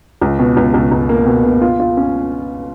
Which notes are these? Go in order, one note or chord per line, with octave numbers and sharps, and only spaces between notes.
C#2
B2
C#2
C#2
C#2
A#3
B2
B2
F4
F4
C#4